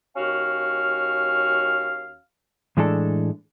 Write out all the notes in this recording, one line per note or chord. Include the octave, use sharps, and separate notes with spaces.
D#2 C#4 F#4 F5 F6
A2 E3 G#3 D4 A4